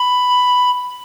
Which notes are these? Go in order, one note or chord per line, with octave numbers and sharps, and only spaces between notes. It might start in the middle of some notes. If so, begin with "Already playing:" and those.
Already playing: B5